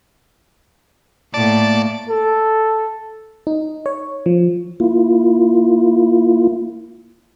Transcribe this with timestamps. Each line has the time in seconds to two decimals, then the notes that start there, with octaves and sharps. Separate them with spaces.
1.34 A2 A#3 D5 A5
2.09 A4
3.47 D#4
3.86 C#5
4.26 F3
4.80 A#3 E4 F4